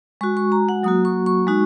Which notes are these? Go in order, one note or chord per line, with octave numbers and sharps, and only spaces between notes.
G#3 F#4 C#6
C#6
A#5
F#5
F#3 A#3 F#4 D#6
C#6
C#6
G#3 D#4 F#4